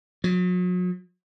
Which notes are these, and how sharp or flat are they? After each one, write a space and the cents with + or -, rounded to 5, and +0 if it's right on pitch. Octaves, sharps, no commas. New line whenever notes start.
F#3 -40